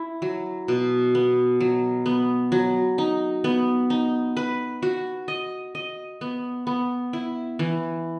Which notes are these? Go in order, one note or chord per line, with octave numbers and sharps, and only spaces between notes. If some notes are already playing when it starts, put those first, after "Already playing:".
Already playing: E4
F#3
B2
B3
F#3
B3
F#3
D#4
B3
D#4
B4
F#4
D#5
D#5
B3
B3
E4
E3